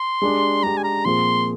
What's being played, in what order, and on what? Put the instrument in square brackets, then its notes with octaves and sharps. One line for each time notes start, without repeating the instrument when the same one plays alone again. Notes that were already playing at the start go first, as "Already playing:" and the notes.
Already playing: [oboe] C6
[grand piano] G#3 D4 G4
[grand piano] G#3 D4 G4 [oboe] A#5
[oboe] G#5
A#5
[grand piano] A#2 F3 C4 F4 G#4 [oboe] C6